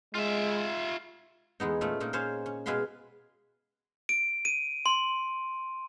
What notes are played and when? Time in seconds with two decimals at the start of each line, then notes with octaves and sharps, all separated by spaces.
0.15 G#3 F4 E5
1.60 E2 G#3 B3 D#4
1.81 A#2 A3 C#4 F4
2.00 A#2 A#3 D#4
2.13 C#4 G#4 C5 C#5 F5
2.46 C#4
2.66 B2 G#3 G#4 F5 B5 C6
4.09 D7
4.45 D#7
4.86 C6